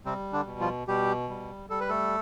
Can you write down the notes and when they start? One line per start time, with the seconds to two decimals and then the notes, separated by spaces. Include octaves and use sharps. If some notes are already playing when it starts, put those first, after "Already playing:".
0.05 C3 G3 C4
0.33 D3 D4
0.46 B2
0.60 F3 F4
0.88 B2 G3 G4
1.29 G3
1.70 G3 A4
1.80 B4
1.89 A3 A4